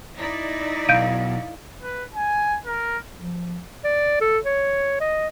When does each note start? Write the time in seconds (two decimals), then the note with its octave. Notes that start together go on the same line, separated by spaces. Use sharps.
0.18 D#4 E4 D5
0.89 B1 F5 G6 D7 D#7
1.82 B4
2.14 G#5
2.66 A#4
3.17 F3
3.84 D5
4.21 A4
4.44 C#5
5.01 D#5